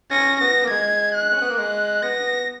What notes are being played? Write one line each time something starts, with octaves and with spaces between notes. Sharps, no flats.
C#4 A#6
B3 A#6
A#3
G#3 G#6
F#6
C#4
B3
A#3
G#3 F#6
B3 A#6